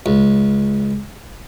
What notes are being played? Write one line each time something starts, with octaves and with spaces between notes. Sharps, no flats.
C#2